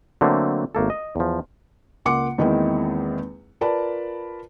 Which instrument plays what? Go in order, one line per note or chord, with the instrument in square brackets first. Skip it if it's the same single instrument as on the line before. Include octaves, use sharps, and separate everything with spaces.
[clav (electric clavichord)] D3 F#3 A3 A#3 C4
G#1 A3 A#3 A4
D#5
E2 F3
[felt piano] C#2 A#3 F#5 C6 D6 C#7
E2 D#3 G#3 A#3 C4 E4
F4 A#4 B4 D5 A5 B5